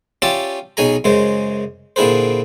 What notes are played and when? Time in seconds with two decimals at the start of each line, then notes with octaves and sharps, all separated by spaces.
0.22 C#4 F4 G4 D5 E5 A5
0.77 B1 C#4 D#4 G#4 G#5 A#5
1.04 F#2 C#3 G#3 C5
1.96 A#2 D3 E4 G#4 B4 C5